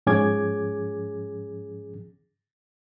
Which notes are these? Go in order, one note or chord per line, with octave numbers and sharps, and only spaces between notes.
G#2 F3 C#4 G#4 D6 G#6